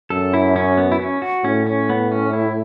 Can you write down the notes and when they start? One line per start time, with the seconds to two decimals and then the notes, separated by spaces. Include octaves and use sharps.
0.10 F#2 A4
0.34 E4
0.56 C#4
0.77 B3
0.92 E4
1.00 C#4
1.22 F#4
1.44 A2 C#4
1.66 C#4
1.90 B3
2.12 C#4
2.33 E4